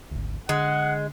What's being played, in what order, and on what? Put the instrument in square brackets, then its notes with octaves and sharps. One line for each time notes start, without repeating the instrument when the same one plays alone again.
[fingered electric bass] G#1 D2
[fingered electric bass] D3 [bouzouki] G#3 [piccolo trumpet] F#5